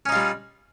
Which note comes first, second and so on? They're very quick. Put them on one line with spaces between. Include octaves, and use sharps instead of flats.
C#4 D#4 F4 G3